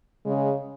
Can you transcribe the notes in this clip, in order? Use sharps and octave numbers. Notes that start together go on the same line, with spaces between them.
C#3 G#3